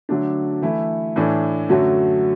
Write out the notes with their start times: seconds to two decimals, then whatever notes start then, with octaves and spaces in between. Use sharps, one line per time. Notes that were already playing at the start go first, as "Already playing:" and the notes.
0.09 D3 F#3 A3 D4
0.62 E3 A3 E4
1.16 A2 E3 D4 A4 D5
1.69 F#2 D3 F#3 A3 F#4